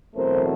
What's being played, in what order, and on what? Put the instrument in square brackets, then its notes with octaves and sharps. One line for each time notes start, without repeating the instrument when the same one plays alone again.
[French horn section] E2 B2 F#3 A3 C4 A#4 C5